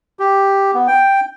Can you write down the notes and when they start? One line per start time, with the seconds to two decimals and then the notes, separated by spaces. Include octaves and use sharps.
0.19 G4
0.74 B3
0.88 G5